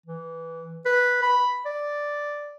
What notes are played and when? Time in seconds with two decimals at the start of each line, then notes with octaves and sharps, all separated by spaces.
0.06 E3
0.85 B4
1.22 B5
1.66 D5